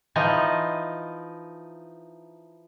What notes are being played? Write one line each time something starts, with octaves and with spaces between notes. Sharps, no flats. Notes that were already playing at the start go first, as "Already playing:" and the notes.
E3 F3 D#4